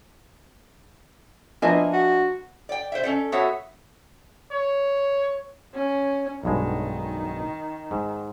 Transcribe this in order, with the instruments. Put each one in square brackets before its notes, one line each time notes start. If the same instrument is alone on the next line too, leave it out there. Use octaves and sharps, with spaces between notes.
[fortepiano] F3 A#3 B3 [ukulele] D4 [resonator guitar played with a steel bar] D#5 E5 G#5
[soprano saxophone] F#4
[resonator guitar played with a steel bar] D5 G5
C5 E5
C#4 A4 D5
B3 F#4 A4 C#5 E5
[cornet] C#5
[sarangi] C#4
[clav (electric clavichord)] B1 G2 G#3 [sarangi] D#3
[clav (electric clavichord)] G#2